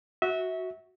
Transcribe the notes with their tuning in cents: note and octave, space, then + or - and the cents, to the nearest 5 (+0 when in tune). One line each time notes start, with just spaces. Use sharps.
F#4 +0 E5 -25